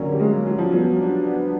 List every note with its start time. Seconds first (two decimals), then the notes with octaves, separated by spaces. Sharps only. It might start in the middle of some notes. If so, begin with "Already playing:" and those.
Already playing: D3 F#3 A#3 C#4
0.12 G3
0.19 G#3 C#4
0.46 F#3 G3
0.58 F3
0.71 F#3 B3
0.99 D4
1.25 B3